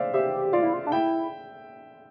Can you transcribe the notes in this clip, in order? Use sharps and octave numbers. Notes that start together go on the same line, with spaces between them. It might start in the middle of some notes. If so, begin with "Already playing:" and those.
Already playing: C5 D5 E5 F5
G4 C5 E5
F4 D5 F5
E4
F4
D4
E4 E5 G5